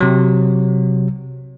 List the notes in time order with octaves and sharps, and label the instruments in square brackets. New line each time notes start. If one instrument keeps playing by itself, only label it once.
[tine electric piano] C3 F#3